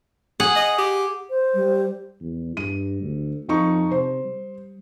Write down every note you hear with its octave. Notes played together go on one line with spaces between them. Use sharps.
G#4 F#5
D#5
G4
C5
G3
E2
G2 D#7
D2
F2 F3 D#4 C#6
C3 C5
G3